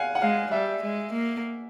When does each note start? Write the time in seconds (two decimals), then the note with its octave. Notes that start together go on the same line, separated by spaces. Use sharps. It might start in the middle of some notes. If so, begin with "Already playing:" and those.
Already playing: F5 F#5 G#5
0.15 F#5
0.21 G#3 F5
0.52 G3 E5
0.83 G#3
1.13 A#3